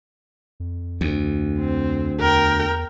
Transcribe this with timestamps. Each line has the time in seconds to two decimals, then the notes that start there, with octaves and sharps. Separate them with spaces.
0.60 F2
1.01 D2
1.59 C4
2.20 E2 A#4 G5